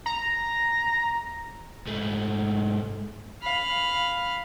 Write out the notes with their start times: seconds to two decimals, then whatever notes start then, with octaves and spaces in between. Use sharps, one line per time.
0.06 A#5
1.87 G#2 A3
3.43 F5 B5